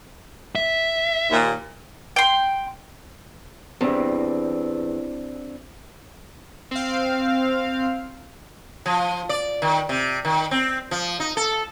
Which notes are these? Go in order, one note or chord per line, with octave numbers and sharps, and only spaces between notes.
E5
D#2 A#2
G5 C6
E2 C4 D4 G4
C4 F5
F3
D5
D#3
C3
D#3
C4
F3
D#4
A4